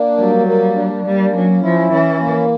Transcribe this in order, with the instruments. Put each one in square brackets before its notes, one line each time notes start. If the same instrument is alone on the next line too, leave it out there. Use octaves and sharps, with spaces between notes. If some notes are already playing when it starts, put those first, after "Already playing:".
Already playing: [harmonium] A#3 D4
[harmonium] F#3 [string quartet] G3
[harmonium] A#3
D4
[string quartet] G3 [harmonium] A#3
[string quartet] F#3 [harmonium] C#4
[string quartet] F3 [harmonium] E4
[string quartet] E3 [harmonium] C#4
[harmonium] A#3